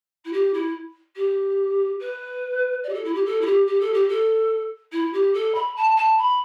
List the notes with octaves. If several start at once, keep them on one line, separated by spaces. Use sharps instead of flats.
E4
G4
E4
G4
B4
D5
G4
A4
E4
G4
A4
E4
G4
G4
A4
G4
A4
E4
G4
A4
B5
A5
A5
B5